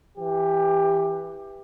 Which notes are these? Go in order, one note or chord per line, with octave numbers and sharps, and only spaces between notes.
E3 G4